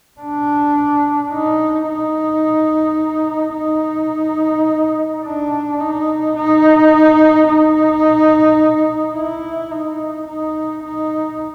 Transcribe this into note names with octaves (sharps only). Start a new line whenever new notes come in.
D4
D#4
D#4
D#4
D4
D#4
D#4
D#4
E4
D#4
D#4
D#4